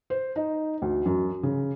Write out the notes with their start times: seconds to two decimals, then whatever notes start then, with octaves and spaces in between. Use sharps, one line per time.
0.10 C5
0.36 D#4
0.82 D2
1.06 F#2
1.43 C#3